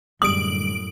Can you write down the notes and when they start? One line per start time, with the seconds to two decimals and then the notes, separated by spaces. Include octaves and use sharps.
0.22 F#2 A2 D3 G3 G#3 D#6 D7 F#7